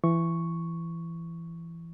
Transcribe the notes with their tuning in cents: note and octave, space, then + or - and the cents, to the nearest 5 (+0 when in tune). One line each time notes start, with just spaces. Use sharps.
E3 +20 C#6 +0